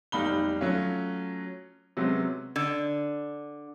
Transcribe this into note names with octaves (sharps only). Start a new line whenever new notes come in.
F1 B1 G3 D#4 B5 G7
F#3 A3 C#4 F4
C3 F#3 G#3 B3 C#4
D3